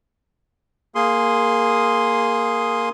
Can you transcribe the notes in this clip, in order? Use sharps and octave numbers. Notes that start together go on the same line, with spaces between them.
A#3 G#4 C6 D#6